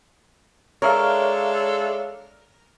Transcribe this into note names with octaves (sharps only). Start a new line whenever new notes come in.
G#3 D4 A4 A#4 C#5 E5 F5